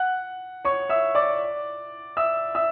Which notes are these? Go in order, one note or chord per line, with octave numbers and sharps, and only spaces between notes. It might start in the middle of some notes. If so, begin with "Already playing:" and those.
Already playing: F#5 F#6
C#5 C#6
E5 E6
D5 D6
E5 E6
E5 E6